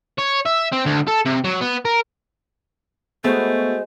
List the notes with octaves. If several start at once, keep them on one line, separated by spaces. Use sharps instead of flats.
C#5
E5
C4
D2
A4
C3
F#3
B3
A#4
G#3 A3 B3 F#4 C5